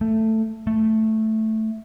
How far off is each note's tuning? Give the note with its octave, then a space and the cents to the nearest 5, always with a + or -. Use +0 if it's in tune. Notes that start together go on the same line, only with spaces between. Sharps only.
A3 +10
A3 +0